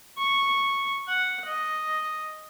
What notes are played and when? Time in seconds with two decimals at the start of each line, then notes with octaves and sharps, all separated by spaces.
0.18 C#6
1.08 F#5
1.46 D#5